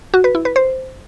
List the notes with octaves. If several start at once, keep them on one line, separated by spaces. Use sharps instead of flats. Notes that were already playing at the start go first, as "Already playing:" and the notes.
F#4
B4
E4
B4
C5